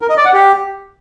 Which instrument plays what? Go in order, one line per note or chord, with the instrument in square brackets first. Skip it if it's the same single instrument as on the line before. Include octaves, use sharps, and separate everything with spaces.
[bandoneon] A#4
D#5
D5
F#5
G4